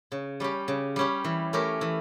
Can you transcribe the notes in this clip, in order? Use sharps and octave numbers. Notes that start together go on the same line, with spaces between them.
C#3
G3 C#4 G4
C#3
G3 C#4 G4
E3
A3 C#4 G4 A#4
E3